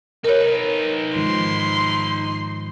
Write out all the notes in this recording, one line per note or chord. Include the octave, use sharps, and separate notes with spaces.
D#4 A#4 B4 C#5
G#2 D#3 F3 C6